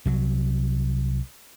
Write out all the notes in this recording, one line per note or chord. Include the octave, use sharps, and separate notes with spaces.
C2 F#3